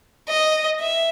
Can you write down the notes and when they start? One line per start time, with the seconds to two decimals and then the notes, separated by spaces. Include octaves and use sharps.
0.28 D#5
0.81 E5